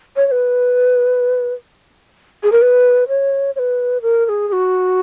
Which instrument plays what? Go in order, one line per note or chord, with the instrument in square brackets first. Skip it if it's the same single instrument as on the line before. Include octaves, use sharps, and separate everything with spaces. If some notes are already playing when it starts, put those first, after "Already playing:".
[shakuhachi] C#5
C#5
B4
G#4
A#4
B4
C#5
C#5
B4
A#4
A#4
G#4
G#4
F#4